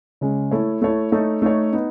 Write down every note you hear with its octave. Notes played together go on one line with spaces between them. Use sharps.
C#3 G#3 C#4
A3 E4 A4 C#5
A3 E4 A4 C#5
A3 D#4 A4 C#5
A3 D#4 A4 C#5
B3 D#4